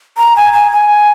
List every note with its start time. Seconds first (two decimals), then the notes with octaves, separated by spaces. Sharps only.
0.17 A#5
0.36 G#5
0.53 G#5
0.71 G#5